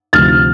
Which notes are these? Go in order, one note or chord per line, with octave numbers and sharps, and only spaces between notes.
D2 C3 F3 F6 A6